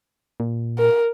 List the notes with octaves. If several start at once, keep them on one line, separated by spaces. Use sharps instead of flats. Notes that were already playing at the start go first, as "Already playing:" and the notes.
A#2
A#4